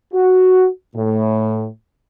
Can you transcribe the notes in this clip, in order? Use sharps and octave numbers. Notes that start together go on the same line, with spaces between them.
F#4
A2